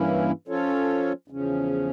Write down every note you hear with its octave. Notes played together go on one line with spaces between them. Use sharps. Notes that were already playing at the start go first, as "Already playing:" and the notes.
Already playing: G2 E3 A#3 C#4 E4
F3 C#4 F4 A4 C#5
E2 C#3 F3 C#4